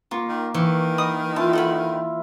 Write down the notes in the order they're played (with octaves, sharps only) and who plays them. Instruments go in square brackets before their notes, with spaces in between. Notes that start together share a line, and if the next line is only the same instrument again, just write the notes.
[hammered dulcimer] A#3 [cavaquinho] F4 C#6
[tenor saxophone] D#3
[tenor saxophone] D#3 [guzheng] E3 [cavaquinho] C#6
[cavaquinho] D#5 B5 D#6
[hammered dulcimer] E4 F4 [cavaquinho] A5
[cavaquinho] A4 F#5 B5